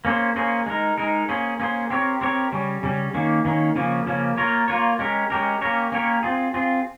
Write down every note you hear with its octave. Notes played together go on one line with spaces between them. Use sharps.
A#3 C#4 G#4 C5
A#3 C#4 G#4 C5
G#3 D#4 A#4
G#3 D#4 A#4
A#3 C#4 G#4 C5
A#3 C#4 G#4 C5
C4 G4 A#4 C#5
C4 G4 A#4 C#5
C#3 G3 C#4
C#3 G3 C#4
D#3 A#3 C#4
D#3 A#3 C#4
C#3 F3 A#3 C#4
C#3 F3 A#3 C#4
A#3 F4 A#4 C#5
A#3 F4 A#4 C#5
G#3 C#4 G4 A#4
G#3 C#4 G4 A#4
A#3 C#4 G4 A#4 C#5
A#3 C#4 G4 A#4 C#5
C4 F4 G#4
C4 F4 G#4